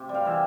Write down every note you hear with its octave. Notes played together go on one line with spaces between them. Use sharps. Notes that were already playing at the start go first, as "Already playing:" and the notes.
Already playing: C3
G3
F5 G5
E3 E5